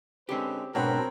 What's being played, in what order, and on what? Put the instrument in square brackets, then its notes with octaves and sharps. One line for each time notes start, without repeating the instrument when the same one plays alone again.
[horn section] D3 G#3 B4 [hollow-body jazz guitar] C4 C#4 G4
[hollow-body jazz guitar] G#2 B3 [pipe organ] B2 D4 [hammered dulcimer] F#3 B4 [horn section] C4 A#4